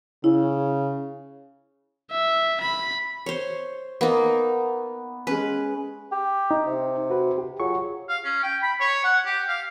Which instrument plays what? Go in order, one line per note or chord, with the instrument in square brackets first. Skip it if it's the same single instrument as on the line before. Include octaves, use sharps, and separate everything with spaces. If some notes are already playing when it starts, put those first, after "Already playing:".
[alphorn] C#3 [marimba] E4
[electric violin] E5
B5
[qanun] C5 C#5
[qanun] A#3 D#4 [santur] B3
[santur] G#3 C#4 [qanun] B4
[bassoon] G4
[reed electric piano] D#4
[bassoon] C3
[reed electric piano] F#4 B4
G4
[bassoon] F#3 [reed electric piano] F4 G#4 C#6
[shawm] F5
C#4
G5
B5
C#5
F#5
G4
F5